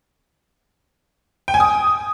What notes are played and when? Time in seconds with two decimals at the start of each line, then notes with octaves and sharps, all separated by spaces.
1.48 G5
1.54 G#5
1.60 D#6